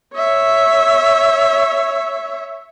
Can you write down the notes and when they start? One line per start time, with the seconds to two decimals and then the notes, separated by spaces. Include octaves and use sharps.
0.15 C#5 E5